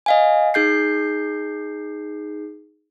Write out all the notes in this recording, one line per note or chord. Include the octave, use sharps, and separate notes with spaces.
D#5 F5 G#5
D#4 G#4 G6 C7